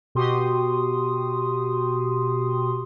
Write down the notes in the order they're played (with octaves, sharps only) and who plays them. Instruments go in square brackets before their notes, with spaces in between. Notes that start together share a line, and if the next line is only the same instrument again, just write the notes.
[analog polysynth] B2 F#4 G4 C6 D#6